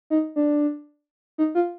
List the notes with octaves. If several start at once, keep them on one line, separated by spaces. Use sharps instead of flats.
D#4
D4
D#4
F4